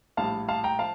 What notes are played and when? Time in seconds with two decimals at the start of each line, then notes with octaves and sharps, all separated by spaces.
0.17 A#1 A2 G3 F5 A5
0.48 F5 A5
0.64 G5 A#5
0.79 F3 F5 A5